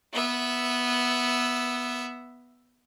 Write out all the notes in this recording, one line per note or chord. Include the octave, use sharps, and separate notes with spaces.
B3 E5